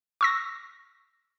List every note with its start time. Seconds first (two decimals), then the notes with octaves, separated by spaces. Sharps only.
0.21 C#6 E6 A#6